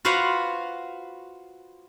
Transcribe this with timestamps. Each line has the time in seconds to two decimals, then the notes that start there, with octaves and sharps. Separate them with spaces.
0.05 F4 F#4 B4 C5 F5 F#5